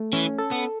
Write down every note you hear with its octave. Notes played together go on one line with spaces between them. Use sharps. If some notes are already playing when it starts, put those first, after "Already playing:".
Already playing: A3
E3 C#4
A4
B3